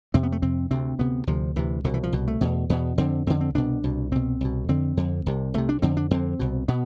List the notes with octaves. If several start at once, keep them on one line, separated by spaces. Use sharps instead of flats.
F2 C3 C4
B3
A3
F2 C3 C4
D2 C3 C4
D2 C3 B3
D2 C3 F3
D2 C3 E3
C2 B2 D3
E3
F3
C2 B2
A3
E2 B2
E2 B2 B3
F2 D3 C4
F2 D3 C4
C4
C2 B2 D4
C2 B2
C2 B2 C4
C2 B2
F2 D3 C4
F2 D3
C2 C3
C2 C3 A3
D4
F2 D3 C4
D4
F2 D3 C4
C2 B2
B2 B3